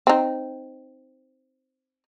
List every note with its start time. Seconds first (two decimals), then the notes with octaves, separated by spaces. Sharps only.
0.07 C4 D#4